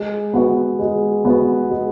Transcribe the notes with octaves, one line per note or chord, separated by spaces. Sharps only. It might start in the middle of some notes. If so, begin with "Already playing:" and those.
Already playing: G#3
B3 F#4
G#3
B3 F#4
G#3